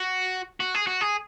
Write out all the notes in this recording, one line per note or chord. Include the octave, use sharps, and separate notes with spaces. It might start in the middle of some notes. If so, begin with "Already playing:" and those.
Already playing: F#4
F#4
G#4
F#4
G#4